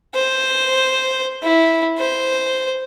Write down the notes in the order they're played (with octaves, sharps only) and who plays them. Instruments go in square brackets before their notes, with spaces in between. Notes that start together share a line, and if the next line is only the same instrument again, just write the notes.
[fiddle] C5
E4
C5